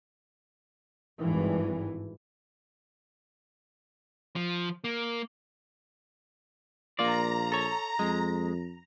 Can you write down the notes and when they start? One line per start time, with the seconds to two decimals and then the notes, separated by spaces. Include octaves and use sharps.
1.21 G#1 G2 E3
4.36 F3
4.84 A#3
6.99 A#1 A#3 F4 D5 A#5
7.52 A4 C#5
7.99 F2 G#3